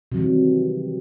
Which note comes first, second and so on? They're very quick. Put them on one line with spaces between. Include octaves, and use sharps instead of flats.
C3 F#3 E3 G3 D#3